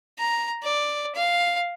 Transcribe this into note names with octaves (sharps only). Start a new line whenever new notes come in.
A#5
D5
F5